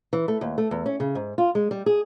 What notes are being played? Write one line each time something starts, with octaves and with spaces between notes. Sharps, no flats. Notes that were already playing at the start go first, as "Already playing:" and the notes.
E3
A3
D#2
A3
E2
C#4
C#3
G#2
F4
G#3
G3
G#4